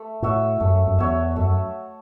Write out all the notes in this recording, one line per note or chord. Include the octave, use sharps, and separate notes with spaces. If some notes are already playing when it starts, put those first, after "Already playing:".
Already playing: A3
A2 F#4 C#5 E5
F#2 A3
F#2
E2 F#4 C#5 E5
F#2 A3